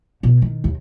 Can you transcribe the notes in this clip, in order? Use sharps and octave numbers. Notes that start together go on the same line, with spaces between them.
B2 D3
D#3
D#2